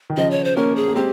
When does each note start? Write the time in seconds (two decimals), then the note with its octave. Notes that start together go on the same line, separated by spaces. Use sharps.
0.10 D#3
0.17 C#3 F3 D#5
0.31 C#5
0.44 C5
0.57 A#3 C#4 A#4
0.76 G#4
0.88 A#3
0.95 G#3 C4 G4